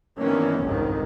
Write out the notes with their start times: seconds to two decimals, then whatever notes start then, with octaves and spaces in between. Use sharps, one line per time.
0.19 G2 D#3 E3 A#3 B3 C#4
0.64 G1 C2 F2 G#2 D#3